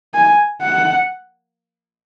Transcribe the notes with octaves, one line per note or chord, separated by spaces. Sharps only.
G#5
F#5